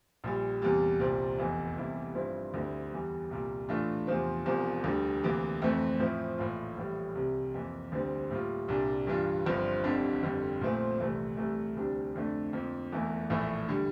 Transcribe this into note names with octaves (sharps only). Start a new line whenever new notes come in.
A#1 A#2 G3
E2 C3 G3 A#3
C2 A#2 G3 C4
F1 E2 E3
E2 C3 G3 A#3 E4
G2 F3 C4 E4
D2 D3 G3 C4 E4
E2 E3 G3
C2 A#2 G3 A#3
A2 E3 A3 D4 F4
E2 C3 F3 C4
E1 E2 C3 F3
D2 D3 G3
D2 C3 E3 A#3
F2 E3 A3 C4
A2 F3 C4 E4
A#1 A2 E3 A#3 F4
A#1 A2 E3 G3
C2 C3 G3
F2 E3 A#3
D2 D3 G3 C4
A2 G3 A#3 F4
C2 A#2 G3 A#3 D4
G2 E3 G3 D4 F4
G1 G2 F3 C4
F1 F2 C3 G3 D4
G1 F2 D3 G3
A#1 A#2 F3 A3 C4
C2 C3 E3 A3
C2 C3 E3 A3
D2 C3 G3 D4
F2 D3 A3 D4
F2 D3 F3 A#3
E1 E2 E3 A3 E4
A#1 A2 E3 A3 E4
D3 G3